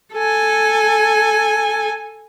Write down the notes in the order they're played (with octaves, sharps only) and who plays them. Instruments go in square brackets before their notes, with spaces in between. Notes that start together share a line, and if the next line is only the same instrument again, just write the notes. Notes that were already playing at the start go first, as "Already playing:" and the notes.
[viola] A4 G#5